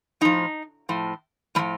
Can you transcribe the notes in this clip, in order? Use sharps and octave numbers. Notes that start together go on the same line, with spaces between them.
A2 F3 D#4
A2 F3
A2 F3 G3